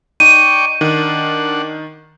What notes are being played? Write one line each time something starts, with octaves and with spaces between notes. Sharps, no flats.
D#4 D5 G5 C#6 D#7
D#3 D4 F#5